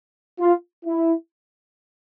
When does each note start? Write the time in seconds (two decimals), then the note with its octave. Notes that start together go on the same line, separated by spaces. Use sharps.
0.40 F4
0.85 E4